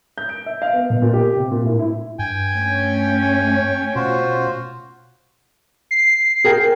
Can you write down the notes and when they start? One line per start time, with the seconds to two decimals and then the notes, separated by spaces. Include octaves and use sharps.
0.18 G6
0.29 D7
0.46 E5
0.62 F5
0.73 B3
0.90 B2
1.02 A#2
1.14 G4
1.37 C3
1.51 A#2
1.66 A2
1.79 E4
2.19 G2 G5 G#5
2.55 A3 C#4
3.95 B2 F4 F#4 C5
5.91 C7
6.45 G#4 A#4 G5